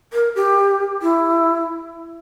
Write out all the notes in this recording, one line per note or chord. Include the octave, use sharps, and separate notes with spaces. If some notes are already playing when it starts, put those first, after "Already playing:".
A#4
G4
E4